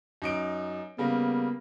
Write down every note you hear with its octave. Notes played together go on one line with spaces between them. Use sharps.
F#2 D#4 D7
C#3 G3 A#3 B3